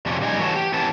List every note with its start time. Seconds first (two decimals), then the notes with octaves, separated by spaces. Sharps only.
0.06 F2 C3 C#4 D4
0.21 C#3 G3 D#4 G#5
0.39 E3 A3 C#4 F#4 C#5 A5
0.56 G4
0.74 E3 B3 C#4 A5